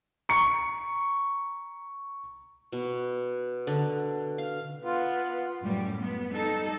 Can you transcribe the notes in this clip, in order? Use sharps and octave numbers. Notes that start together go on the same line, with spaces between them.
A#5 C#6 C#7
B2
D3
F5
B3 F4
F#2 A2 G3
B3
G3 D#4 A4